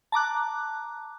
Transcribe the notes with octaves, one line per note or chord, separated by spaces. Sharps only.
A5 A#5 D6 F#6